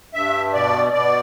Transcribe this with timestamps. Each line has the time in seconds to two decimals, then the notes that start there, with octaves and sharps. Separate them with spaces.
0.14 G2 E5
0.54 B2 D5
0.93 B2 D5